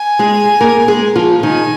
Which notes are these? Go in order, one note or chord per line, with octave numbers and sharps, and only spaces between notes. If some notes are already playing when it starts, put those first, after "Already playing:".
Already playing: G#5
G#3 G#4
A#3 A#4
G#3 G#4
F3 F4
D#3 D#4 G#5